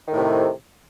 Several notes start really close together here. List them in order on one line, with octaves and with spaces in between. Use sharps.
D#3 A2 C3